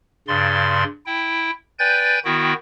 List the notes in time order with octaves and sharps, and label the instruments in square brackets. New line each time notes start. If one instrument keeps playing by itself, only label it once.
[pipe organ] G2 C#3 D5 C6
E4 G5
B4 D5 G5 G#5 G6 A6
D#3 B3 E4 F#4 G5